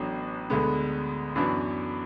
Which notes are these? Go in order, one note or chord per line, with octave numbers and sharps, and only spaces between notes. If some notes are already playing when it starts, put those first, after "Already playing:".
Already playing: A1 A2 F#3 B3 D4
D2 D3 G#3 B3
F#2 E3 B3 D4 F#4